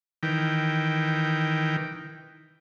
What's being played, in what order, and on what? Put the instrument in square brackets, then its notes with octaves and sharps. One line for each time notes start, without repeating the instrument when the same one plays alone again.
[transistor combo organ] D#3 E3 G5